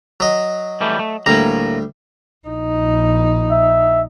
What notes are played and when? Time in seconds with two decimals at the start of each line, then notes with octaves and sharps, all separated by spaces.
0.20 F#3 D#5
0.81 E3 G3 A3
0.99 A3
1.26 D2 A2 G3 A#3 A#5
2.48 A#1 D#4
3.51 E5